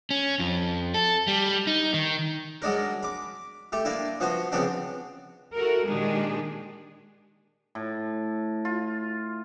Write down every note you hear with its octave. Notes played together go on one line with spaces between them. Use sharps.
C#4
F2
A4
G3
D#4
D#3
F#3 G#3 D4 A#4
B5 D6
A3 G4
A#3 D4 E4
F3 B3 F#4 C5
C#3 F3 B3 C4 D4
E4 F#4 A4 A#4
A#2 D#3 G#3 D4 G4 G#4
A2
F4